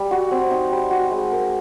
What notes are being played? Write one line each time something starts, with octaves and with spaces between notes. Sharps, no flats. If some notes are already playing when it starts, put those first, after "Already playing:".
Already playing: G3
F#4
C4
D#4
G3
F#4
G#3
A#4